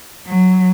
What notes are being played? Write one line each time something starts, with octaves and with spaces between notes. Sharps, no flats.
F#3